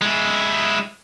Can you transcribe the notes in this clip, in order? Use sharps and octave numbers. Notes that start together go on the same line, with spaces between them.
G#3 E4